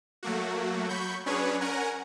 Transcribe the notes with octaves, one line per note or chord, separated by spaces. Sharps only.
F#3 A3 A#3 F#4
F#3 B5 C#6 G6
F#3 C#4 D4 G#4 B4 C#5
C#4 A#4 F#5 G#5 A#5